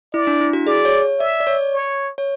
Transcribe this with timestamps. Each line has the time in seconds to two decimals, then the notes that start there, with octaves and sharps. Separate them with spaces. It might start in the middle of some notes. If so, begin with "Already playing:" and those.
0.14 E4 D5
0.27 D4
0.41 E4
0.53 F#4
0.67 G#4 D5
0.85 C#5
1.20 D5 E5
1.40 D5
1.47 C#5
1.74 C#5
2.18 C#5